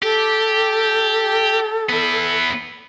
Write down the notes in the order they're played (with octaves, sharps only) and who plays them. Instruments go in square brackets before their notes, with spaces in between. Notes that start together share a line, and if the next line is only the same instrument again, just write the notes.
[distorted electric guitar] G4 [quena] A4
[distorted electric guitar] B3 E4